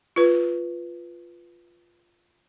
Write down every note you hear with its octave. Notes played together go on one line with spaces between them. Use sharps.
F4 B4